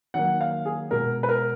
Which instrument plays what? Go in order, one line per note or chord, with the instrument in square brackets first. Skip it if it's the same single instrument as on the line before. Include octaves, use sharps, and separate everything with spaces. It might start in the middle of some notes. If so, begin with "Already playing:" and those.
[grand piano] D#3 F#3 A#3 F#5
F5
G#4
B2 G#3 A#4
B4
A#4